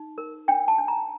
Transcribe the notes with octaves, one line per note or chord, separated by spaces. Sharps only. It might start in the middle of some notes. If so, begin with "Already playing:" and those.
Already playing: D#4
A#4
D4 G5
A5
D4
A#5